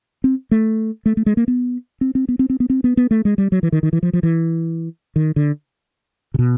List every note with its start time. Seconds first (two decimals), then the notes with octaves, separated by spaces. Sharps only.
0.24 C4
0.51 A3
1.06 A3
1.17 A3
1.26 G#3
1.37 A#3
1.48 B3
2.01 C4
2.15 C4
2.29 B3
2.39 C4
2.50 C4
2.60 B3
2.70 C4
2.84 B3
2.97 B3
3.11 A3
3.25 G#3
3.38 G3
3.52 F#3
3.63 E3
3.72 D#3
3.83 D#3
3.93 E3
4.03 F3
4.13 F3
4.23 E3
5.16 D#3
5.36 D3
6.34 C3
6.39 B2